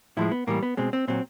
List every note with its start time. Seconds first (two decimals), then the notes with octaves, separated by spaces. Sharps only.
0.17 A2 F3 G#3 E4
0.31 B3
0.47 A2 E3 G3 A#3
0.63 B3
0.77 B2 G#3 C4
0.93 C4
1.08 A#2 F#3 C4